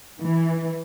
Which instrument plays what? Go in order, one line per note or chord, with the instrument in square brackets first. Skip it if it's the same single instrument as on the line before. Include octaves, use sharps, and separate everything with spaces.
[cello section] E3